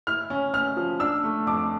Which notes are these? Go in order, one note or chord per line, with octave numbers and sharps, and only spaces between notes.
E4 F6
C#4
C#4 F6
F3
D4 E6
A3
F2 D6